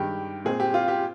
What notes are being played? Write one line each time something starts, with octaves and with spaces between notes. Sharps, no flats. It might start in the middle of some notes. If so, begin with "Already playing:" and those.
Already playing: G2 D#3 G#3 G4
A#2 G#3 C4 G#4
G4
F4
G4